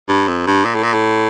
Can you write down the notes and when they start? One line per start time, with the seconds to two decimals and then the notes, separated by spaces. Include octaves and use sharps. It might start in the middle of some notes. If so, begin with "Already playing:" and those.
0.09 G2
0.28 F2
0.47 G2
0.65 A#2
0.75 A2
0.83 A#2
0.94 A2